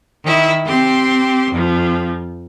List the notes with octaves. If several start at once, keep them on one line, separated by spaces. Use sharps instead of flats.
D#3 E4
C4 G4 C6
F2 F3